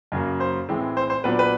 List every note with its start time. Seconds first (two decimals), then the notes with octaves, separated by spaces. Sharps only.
0.12 F#2 C#3 F#3 A#3
0.40 C5
0.69 A2 E3 G#3 C4
0.97 C5
1.10 C5
1.24 A#2 F#3 B3 D4 B4
1.39 B4